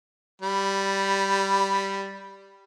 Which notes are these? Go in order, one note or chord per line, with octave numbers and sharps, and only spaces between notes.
G3 B5